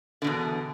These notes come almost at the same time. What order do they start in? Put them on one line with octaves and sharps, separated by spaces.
D3 B2 E2